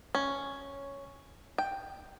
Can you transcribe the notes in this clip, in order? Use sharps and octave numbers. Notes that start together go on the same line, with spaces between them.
C#4
G5